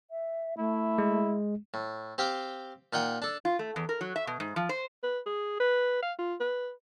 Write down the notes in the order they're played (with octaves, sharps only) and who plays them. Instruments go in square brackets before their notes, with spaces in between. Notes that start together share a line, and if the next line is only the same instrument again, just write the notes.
[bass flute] E5
[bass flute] A3 [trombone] E4
[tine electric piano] G#3
[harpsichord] A2
C4 G4 F5 G5
A#2 D#4 F#5 G5 D#6
D4 A4
[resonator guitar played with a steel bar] F4
A3
E2
A#4
F#3
E5
B2
G#2
F3
C5
[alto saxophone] B4
G#4
B4
F5
F4
B4